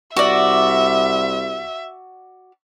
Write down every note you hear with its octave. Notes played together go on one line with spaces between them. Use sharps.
C2 F#4 D5 E5